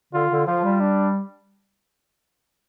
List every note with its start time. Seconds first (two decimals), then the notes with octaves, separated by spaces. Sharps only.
0.13 D3 F4
0.31 D3
0.46 F3 F4
0.64 G3
0.80 D4